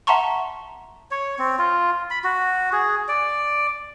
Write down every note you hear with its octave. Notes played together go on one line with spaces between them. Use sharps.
E5 F#5 A5 A#5 C6 C#6
C#5
C4
F4
B5
F#4
G#4
D5